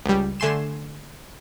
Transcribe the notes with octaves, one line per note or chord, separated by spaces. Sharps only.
C#2 G3
D3 A3 G#5 C6 E7